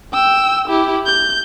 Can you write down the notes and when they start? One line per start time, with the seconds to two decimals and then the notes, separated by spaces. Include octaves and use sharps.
0.13 G5 E6
0.68 E4 G4
1.06 G6